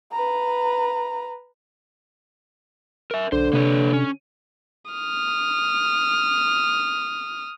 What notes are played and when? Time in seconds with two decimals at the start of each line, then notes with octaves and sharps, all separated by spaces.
0.12 B4 A#5
3.11 A#4 E5
3.32 B1 D3 C5
3.53 C3 A#3 B4 C#5
3.93 C#4
4.92 D#6 F6